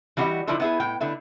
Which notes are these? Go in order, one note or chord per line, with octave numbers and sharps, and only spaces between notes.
E3 G3 E4 F#4 G4 D#5
D3 F3 D#4 E4 D5
B3 E4 G#4
A2 G5
D3 A3 E4